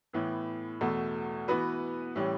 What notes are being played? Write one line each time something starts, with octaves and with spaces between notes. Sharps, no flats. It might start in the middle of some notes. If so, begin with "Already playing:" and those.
A2 E3 B3
E2 B2 A3
E3 B3 F#4 B4
A2 E3 G3 C#4